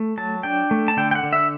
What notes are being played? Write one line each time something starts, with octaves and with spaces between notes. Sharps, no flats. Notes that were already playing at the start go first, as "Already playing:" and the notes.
Already playing: A3
F#3 A5
D4 G5
A3
A5
D3 G5
G5
F#5
D3
E5